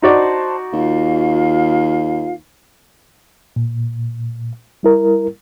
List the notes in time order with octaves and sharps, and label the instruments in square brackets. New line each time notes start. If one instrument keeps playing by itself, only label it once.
[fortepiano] D#4 F#4 D5 [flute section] C5 A5 C6
[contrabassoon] D#2 [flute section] F4 F5
[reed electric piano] A#2
G3 E4 A#4